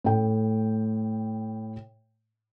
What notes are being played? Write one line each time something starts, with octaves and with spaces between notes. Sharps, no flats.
A2 A3 G5